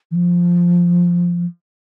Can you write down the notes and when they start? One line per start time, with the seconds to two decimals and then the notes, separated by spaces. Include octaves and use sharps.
0.11 E3
0.15 F3